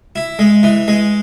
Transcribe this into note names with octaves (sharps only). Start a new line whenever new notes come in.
E4
G#3
E3
G#3